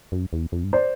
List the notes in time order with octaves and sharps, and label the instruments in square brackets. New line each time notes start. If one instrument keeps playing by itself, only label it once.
[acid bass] F#2
E2
F2
G2
[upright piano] C5 D5